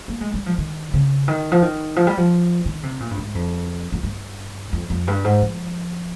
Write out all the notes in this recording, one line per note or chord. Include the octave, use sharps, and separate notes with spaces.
A#3
G#3
G3
F3
D#3
C#3
D#3
F3
D#3
F3
G3
F3
D#3
C3
A#2
G2
G#2
F2
F2
G2
F2
F2
G2
G#2
F3